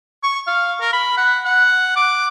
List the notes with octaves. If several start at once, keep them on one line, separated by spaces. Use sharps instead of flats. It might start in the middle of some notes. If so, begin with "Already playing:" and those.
C#6
F5
A#4
B5
F#5
F#5
D6